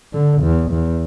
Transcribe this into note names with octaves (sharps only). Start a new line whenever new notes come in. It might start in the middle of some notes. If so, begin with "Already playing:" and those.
D3
E2
E2